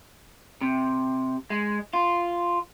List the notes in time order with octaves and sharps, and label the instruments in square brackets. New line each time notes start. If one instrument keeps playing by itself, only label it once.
[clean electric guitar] C3
G#3
F4